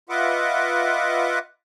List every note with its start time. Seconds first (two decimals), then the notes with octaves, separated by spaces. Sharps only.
0.09 F4 B4 D#5 E5 F#5 D6